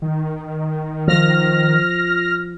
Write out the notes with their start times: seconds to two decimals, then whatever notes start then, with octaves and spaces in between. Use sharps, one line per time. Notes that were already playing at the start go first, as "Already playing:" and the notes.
0.02 D#3
1.07 F3 F6 A#6